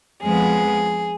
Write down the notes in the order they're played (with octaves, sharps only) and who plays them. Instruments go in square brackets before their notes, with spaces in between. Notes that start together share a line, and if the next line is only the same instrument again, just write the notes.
[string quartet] F2 F3 G#3 B3 G#4